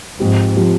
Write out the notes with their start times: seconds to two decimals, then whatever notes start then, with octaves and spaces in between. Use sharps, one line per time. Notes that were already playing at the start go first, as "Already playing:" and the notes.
0.20 G#2 F3 C4 G4
0.56 F3 C4 G4